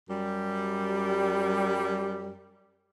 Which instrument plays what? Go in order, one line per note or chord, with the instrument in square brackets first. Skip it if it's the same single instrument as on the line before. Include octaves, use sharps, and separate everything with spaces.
[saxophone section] F#2 G3